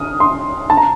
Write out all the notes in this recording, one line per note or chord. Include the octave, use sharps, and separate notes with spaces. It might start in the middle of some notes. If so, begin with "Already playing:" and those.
Already playing: D#6 F6
C6
A5
A#5